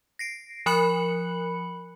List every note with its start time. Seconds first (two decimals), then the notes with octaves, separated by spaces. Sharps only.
0.19 A#6 C7 D7
0.66 F3 A#4 B5 F#6 C#7 F#7